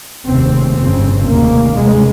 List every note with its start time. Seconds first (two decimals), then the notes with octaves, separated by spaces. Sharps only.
0.27 F1 D#2 C#3 C4
0.76 G1 F2 C#3 C4
1.26 F1 D#2 C#3 A#3
1.76 F1 F2 C#3 G#3